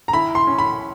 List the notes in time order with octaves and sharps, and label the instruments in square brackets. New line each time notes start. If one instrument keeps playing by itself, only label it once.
[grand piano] A#5
E4 B5
C6
C#4
B5